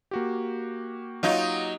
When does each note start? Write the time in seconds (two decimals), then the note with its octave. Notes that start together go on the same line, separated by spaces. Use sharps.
0.11 A#3 F#4 G4
1.23 F#3 D#4 F4